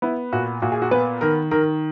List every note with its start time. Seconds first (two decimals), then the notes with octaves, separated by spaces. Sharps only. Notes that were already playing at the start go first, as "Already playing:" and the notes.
0.02 B3 E4
0.32 A#2 F#4
0.62 A#2 F#4
0.72 G#4
0.82 F#4
0.91 B3 B4
1.21 D#3 A#4
1.51 D#3 A#4